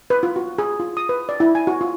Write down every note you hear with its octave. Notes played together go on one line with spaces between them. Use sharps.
B4
F4
F#4
G#4
F4
D#6
B4
D5
E4
G#5
F#4
F4